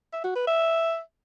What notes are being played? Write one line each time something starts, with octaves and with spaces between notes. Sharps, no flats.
E5
F#4
B4
E5